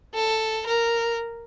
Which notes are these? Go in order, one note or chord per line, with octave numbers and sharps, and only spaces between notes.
A4
A#4